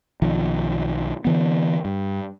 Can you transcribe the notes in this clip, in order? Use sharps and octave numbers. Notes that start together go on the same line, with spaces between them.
B1 D#3 F3
D3 E3 B3
G2